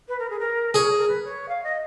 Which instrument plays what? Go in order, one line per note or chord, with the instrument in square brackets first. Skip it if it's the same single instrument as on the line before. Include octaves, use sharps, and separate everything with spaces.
[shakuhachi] B4
A#4
G#4
A#4
[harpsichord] G#4 [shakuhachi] C#5
[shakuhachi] A#4
B4
C#5
F5
D#5